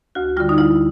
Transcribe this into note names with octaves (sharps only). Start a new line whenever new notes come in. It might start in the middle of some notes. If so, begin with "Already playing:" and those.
D2 F#4
D3 G3 F4
D#4
D2 E4